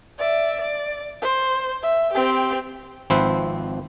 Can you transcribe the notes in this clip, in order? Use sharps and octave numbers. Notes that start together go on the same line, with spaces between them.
D5 E5
D5
C5
E5
C4 G4
G#1 F3 C4 B4 C5 E5